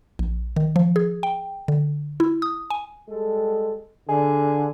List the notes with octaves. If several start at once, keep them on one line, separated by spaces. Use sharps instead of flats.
A#1
D#3
F3
G#4
G5
D3
E4
D#6
G#5
G3 G#3 A4
D3 G#4